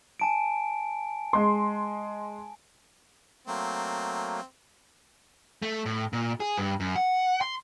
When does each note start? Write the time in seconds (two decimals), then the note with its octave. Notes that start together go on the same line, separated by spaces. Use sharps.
0.20 G#5 A5 D7
1.33 G#3 C6
3.48 F#3 A3 A#3 C4
5.62 A3
5.86 A2
6.13 A#2
6.40 G#4
6.58 G2
6.80 F#2
6.96 F#5
7.41 C6